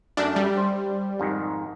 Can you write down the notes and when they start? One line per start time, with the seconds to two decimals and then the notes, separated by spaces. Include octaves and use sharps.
0.17 F#2 A3 D4
0.36 G3
0.57 C5
1.20 F2 G#2 D#3